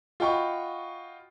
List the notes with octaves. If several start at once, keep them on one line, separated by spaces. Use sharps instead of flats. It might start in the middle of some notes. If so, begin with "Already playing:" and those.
F4 F#4 D#5 G5 B5 C#6